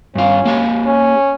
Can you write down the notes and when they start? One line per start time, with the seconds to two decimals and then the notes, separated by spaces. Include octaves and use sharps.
0.15 G2 C#4 F4
0.45 A#3 G4 G#5
0.86 C#4